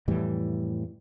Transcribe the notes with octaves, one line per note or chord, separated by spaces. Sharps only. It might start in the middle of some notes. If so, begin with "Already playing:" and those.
F2 A2 E3 G3